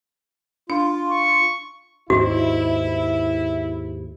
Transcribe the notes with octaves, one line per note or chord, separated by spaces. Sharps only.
D4 F4
C#6
D#2 G#2 E4 F#4